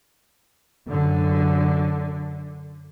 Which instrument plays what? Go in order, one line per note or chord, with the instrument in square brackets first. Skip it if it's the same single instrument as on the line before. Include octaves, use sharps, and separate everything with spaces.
[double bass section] F#2 D3